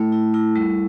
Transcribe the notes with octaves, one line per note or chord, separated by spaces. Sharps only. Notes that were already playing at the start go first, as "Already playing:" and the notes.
Already playing: A3 E4 A4
E4
E4
G3